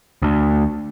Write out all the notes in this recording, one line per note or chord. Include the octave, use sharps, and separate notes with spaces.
D2